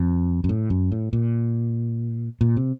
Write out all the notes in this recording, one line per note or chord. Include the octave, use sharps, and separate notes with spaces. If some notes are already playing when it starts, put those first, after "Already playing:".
Already playing: F2
F#2
A2
F#2
A2
A#2
A#2
C3